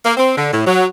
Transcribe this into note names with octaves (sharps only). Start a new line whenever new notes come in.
A#3
C4
D3
A2
F#3